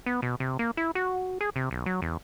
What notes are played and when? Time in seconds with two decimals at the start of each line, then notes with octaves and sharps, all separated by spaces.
0.06 B3
0.22 B2
0.40 C3
0.59 A#3
0.77 E4
0.95 F#4
1.41 G#4
1.56 C3
1.71 B1
1.86 F#3
2.02 E2